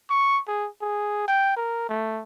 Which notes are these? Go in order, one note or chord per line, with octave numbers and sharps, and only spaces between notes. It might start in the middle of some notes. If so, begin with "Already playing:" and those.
C#6
G#4
G#4
G5
A#4
A3